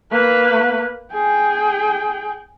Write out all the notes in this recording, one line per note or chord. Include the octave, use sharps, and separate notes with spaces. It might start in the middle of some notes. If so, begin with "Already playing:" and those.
A#3 B4
G#4 G5